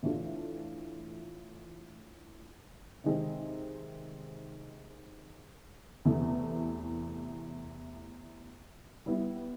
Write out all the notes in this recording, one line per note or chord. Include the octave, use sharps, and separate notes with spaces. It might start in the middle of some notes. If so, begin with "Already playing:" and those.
A2 E3 A3 D4 F4
C3 D#3 G#3 C4
E2 C3 E3 A3
G3 B3 E4